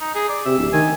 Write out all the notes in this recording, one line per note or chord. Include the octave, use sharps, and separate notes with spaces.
D#4
G#4
D5
C3 E5
D1
D#3 G#5